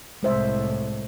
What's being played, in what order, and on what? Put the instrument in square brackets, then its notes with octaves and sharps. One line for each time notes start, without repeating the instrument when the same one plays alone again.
[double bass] C2 A2 [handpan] G#3 C5 E5